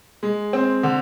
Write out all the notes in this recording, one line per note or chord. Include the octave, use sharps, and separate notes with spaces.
G#3
C4
D3